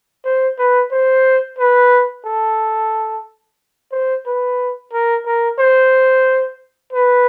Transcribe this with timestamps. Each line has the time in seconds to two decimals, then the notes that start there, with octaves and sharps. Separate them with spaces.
0.25 C5
0.59 B4
0.92 C5
1.58 B4
2.26 A4
3.92 C5
4.26 B4
4.93 A#4
5.26 A#4
5.59 C5
6.93 B4